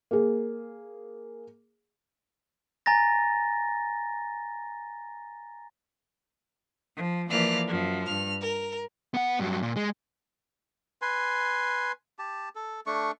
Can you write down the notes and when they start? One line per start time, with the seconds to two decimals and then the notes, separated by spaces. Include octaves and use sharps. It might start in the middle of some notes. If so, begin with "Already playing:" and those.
0.11 A#3 G#4
2.86 G#5 A#5 A6 A#6
6.96 F3
7.29 E3 F3 A#3 D5 F6 F#6
7.67 F#2 F3
8.06 G2 F6
8.40 A#4
9.14 B3 F#5
9.39 G2 F#3
9.63 A#2
9.76 G#3
11.02 B4 G#5 C6
12.19 G4 A5
12.55 A4
12.86 A3 D4 C#6